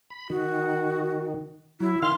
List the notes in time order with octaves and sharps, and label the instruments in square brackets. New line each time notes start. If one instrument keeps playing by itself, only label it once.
[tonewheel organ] B5
[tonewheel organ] D#3 [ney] F#4
[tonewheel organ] F#3 [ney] E4
[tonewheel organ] D#3 F5 F6 [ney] C6